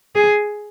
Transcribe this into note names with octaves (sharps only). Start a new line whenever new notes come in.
G#4